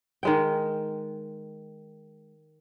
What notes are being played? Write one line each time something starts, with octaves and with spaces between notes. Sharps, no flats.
D#3 G#3 G5